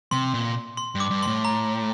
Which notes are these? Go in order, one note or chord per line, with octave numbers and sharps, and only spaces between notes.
C3 C6
A#2
C6
G2
D6
G2
A2 C6
A#5